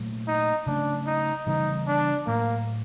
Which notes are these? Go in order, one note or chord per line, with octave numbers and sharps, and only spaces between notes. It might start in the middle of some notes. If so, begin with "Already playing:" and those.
Already playing: A#2 F#3 A3
D#4
C#3 F#3 A3 C#4 D4
D#4
C#3 E3 G3 B3 D#4
D4
A2 F#3 A3 A#3